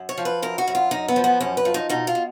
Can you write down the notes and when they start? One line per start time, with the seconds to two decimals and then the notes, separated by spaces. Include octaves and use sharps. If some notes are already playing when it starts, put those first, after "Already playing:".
Already playing: F#2
0.09 C#5
0.18 F3
0.25 B4
0.42 F#2 A#4
0.58 F#4
0.68 F#2
0.75 F4
0.91 F#2 D#4
1.08 B3
1.16 F3
1.24 B3
1.40 F#2 C#4
1.57 B4
1.65 F3
1.74 D#4
1.89 B2 D#4
2.07 F4
2.15 B2